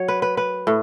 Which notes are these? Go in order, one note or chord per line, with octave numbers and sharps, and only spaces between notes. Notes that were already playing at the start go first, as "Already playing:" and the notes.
Already playing: F#3 C#5
B4
B4
B4
A2